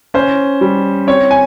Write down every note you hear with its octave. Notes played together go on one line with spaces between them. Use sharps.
C#4 C5
G3
C4 C#5
G#5